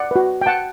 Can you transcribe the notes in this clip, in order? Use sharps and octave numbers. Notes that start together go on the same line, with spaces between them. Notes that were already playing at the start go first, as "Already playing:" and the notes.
Already playing: D5 F#5
F#4 B4
G5
F#5 A5